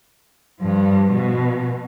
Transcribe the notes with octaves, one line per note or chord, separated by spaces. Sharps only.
G2 F3
B2